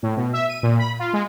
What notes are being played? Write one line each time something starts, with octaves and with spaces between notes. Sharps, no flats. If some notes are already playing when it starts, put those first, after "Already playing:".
A2
B2
E5
D#7
A#2
B5
F4
G#3